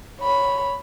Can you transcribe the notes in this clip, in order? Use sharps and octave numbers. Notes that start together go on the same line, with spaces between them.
C#5 B5